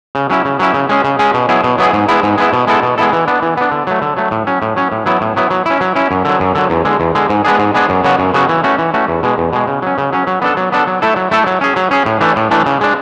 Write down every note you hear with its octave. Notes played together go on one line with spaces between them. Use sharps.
C#3
F#3 C#4 E4
C#3
F#3 C#4 E4
C#3
G#3 C#4 G#4
C#3
G#3 C#4 G#4
B2
F#3 B3 E4 G#4
B2
F#3 B3 E4 G#4
G#2
G#3 B3 E4
G#2
G#3 B3 E4
B2
G#3 B3 E4 A4
B2
G#3 B3 E4 A4
E3
B3 D4
E3
B3 D4
D3
F#3 A3
D3
F#3 A3
A2
F#3 C#4
A2
F#3 C#4
A2
F#3 B3 E4
A2
F#3 B3 E4
F#3
C#4 E4
F#3
C#4 E4
F#2
D3 F#3
F#2
D3 F#3
E2
D3 G#3
E2
D3 G#3
G#2
G#3 B3 D4 G#4
G#2
G#3 B3 D4 G#4
F#2
C#3 F#3 B3 F#4
F#2
C#3 F#3 B3 F#4
E3
A3 C#4 F#4
E3
A3 C#4 F#4
E2
B2 G#3
E2
B2 G#3
C#3
F#3 C#4
C#3
F#3 C#4
F#3
B3 D4 A4
F#3
B3 D4 A4
F#3
A3 E4 A4
F#3
A3 E4 A4
F#3
C#4 G#4
F#3
C#4 G#4
A2
E3 A3 D4
A2
E3 A3 D4
C#3
G#3 D4